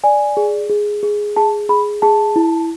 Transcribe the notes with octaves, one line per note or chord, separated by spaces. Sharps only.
D5 G#5
G#4
G#4
G#4
G#4 A5
G#4 B5
G#4 A5
E4